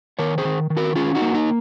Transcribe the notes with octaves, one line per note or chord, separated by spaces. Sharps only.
D#3 A#4 C#5
G#4 C5
D#3
D#3
F#4 A#4
C#4 F4 G#4
D#4 F#4
A#3
D#4